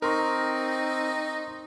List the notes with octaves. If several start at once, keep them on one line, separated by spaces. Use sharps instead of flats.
C4 D#4 A#4 A#5 C6 C#6